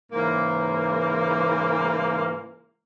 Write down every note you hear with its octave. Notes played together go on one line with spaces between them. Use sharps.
G#2 C#3 E3 A#3